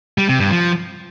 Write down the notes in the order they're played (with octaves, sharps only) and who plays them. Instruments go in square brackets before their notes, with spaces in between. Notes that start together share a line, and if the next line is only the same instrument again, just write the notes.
[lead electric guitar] G3
C3
G2
F3